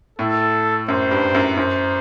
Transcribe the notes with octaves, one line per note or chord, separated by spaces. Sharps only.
A2 A4
F#2 C5
G2
F#2
F#2 C5